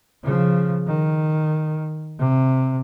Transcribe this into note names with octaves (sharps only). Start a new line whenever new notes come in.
C#3 F3
D#3
C3